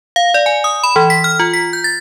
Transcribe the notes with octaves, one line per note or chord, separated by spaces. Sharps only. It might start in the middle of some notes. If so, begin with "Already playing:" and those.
F5
D5
G#5
D#6
B5
E3
B6
F6
F4
B6
G6
A6